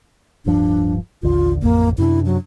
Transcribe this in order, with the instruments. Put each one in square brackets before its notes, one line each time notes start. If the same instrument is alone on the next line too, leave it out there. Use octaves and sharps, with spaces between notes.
[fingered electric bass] D1 G2 F3 [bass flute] D4
[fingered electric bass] A1 D#2 D3 [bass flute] F4
[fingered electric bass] A1 F2 [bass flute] A#3
[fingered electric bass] F#2 C3 D4 [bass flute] E4
[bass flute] F#3